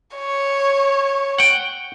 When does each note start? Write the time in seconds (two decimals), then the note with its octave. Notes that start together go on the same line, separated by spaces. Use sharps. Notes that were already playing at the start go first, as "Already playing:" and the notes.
0.15 C#5
1.38 F#5 G5